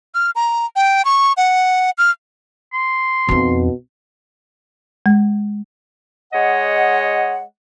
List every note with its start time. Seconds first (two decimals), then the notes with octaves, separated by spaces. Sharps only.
0.15 F6
0.36 A#5
0.76 G5
1.05 C#6
1.37 F#5
1.98 F6
2.73 C6
3.29 F2 B2 D#4
5.06 G#3
6.32 G#3 C#5 D#5 F#5